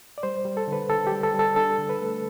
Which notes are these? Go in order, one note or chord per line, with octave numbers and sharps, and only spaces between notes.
D5
G3 C5
G3
A4
D3 B4
D3 A4
G4
G3
A4
G3
A4
D4 A4
D3
B4
A3